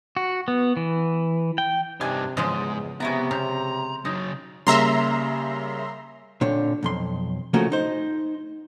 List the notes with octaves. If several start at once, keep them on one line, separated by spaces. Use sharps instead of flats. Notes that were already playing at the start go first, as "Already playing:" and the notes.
F#4
B3
E3
G5
G2 C3 D4 D#4 G#5
E2 G#2 C#3 F3 G#3 D#5
C3 B3 C#4 E4 A#5
C#3 C5 A#5
C#3 F#3 D#4
C#3 G3 A#3 E5 A#5 C6
A#2 D3 C4 C#5
B1 F2 C6
C#3 F3 A3 A#3 F#4 A#4
D#4 C5